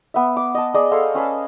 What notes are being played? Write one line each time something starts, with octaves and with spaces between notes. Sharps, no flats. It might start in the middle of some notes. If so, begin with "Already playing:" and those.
B3 E5
D6
D#5 A5
G#4 D5 D#5
G#4 A4 C5 F5
C#4 B4 G#5 A5